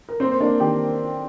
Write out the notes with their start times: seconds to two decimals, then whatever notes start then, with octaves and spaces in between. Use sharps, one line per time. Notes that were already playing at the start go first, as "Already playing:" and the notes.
0.09 A#4
0.20 A#3 C4 C5
0.32 C5
0.40 A#3 D4 D5
0.60 D#3 G4 G5